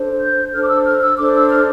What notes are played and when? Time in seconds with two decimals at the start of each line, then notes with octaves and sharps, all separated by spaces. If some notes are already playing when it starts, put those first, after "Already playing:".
Already playing: D4 A4 C5
0.21 G6
0.53 D4 A4 C5 F6
0.62 D6
0.69 E6
0.85 F6
1.02 E6
1.17 D4 A4 C5 D6
1.34 E6
1.51 F6